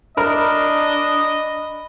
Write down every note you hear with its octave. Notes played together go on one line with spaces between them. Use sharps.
D4 A#4 D#5 B5